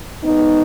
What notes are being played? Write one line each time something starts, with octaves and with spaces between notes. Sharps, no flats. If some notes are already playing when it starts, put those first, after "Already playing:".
G#2 G#3 B3 D#4